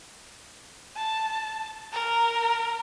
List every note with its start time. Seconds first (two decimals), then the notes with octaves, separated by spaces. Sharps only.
0.96 A5
1.93 A#4